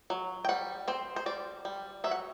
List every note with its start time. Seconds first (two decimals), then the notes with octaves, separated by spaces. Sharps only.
0.10 F#3
0.45 G5
0.49 G3 F#5
0.88 C4 C5
1.16 C5
1.26 G3 D5
1.65 G3
2.04 F#3 E5
2.11 F#5